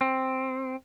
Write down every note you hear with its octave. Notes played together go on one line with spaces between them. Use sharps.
C4